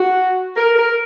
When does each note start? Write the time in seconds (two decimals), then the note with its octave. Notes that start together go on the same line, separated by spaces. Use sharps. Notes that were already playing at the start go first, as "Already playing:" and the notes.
Already playing: F#4
0.56 A#4
0.76 A#4